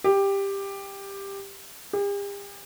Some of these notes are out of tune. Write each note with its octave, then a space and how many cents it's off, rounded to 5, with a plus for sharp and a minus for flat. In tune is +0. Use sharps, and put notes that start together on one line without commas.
G4 +10
G4 +45